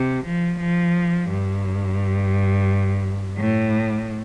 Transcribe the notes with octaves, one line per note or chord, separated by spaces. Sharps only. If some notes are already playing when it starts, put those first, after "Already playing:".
Already playing: C3
F3
F3
G2
A2